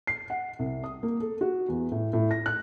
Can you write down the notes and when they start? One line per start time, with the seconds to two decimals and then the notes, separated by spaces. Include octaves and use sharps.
0.07 C7
0.30 F#5
0.59 C2
0.84 D#6
1.03 A#3
1.20 A4
1.41 F#4
1.69 E2
1.92 A2
2.13 A2
2.31 A#6
2.46 F#6